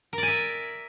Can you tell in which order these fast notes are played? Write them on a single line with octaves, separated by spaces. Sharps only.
A#4 D5 G#5 E5